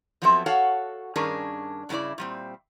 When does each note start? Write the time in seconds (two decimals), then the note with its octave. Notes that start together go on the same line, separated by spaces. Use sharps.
0.22 F3 F#3 B3 C4 A4 E5
0.46 F#4 A4 C#5 F5 F#5
1.16 G2 D#3 C#4 D4 G#4 A#4
1.89 G2 C#3 B3 E4 D5
2.18 A#2 G3 C4